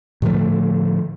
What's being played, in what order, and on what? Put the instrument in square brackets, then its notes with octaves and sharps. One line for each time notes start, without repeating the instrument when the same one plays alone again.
[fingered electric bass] A2 D3 F3 A3